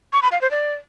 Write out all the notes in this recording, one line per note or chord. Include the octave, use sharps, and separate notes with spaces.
C#6
B5
F5
C5
D5